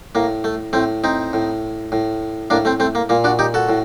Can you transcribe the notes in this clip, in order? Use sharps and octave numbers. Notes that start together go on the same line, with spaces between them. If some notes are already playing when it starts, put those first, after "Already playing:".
A2 A#3
A3
A2 A3 C4
C4 D#4
A2
A2
A2 A#3 D4
A3 C4
A3 C4
A#3
A#2 A#3
D4 F#4
D#4 G4
F#4 A4
A2